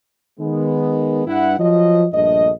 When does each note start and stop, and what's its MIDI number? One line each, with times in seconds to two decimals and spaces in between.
0.40 1.24 51
0.40 1.24 56
0.40 1.24 59
1.27 1.57 43
1.27 1.57 64
1.27 1.57 78
1.59 2.06 53
1.59 2.06 54
1.59 2.06 75
2.13 2.50 34
2.13 2.50 43
2.13 2.50 57
2.13 2.50 75